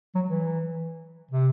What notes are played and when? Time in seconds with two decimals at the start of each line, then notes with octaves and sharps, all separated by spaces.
0.15 F#3
0.28 E3
1.31 C3